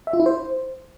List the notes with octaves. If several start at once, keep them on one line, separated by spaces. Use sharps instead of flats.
E5
F4
E4
C5